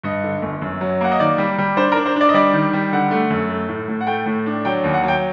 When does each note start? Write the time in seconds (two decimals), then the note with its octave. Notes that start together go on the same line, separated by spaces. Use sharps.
0.03 G2 D#5
0.24 D3
0.42 G1
0.62 F#2
0.81 F#3
1.01 A#3 F#5
1.11 D#5
1.20 D#3 D5
1.38 G3
1.58 G3
1.77 D4 C5
1.92 A#4
1.96 D4
2.06 C5
2.16 D4 D5
2.29 D#5
2.34 G3 D5
2.53 D#3
2.73 G3
2.92 D3 F#5
3.11 A3
3.30 F#2
3.50 A3
3.68 A2
3.88 A2
4.01 F#5
4.07 A3 G5
4.26 A2
4.46 D4
4.65 F#3 G5
4.84 D#2
4.94 F#5
5.03 F#3 G5